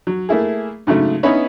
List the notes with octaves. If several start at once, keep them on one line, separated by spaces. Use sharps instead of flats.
F#3
A3 A#3 E4 G#4
G#2 C#3 F#3 A3
B3 C#4 D#4 E4 B4 C#5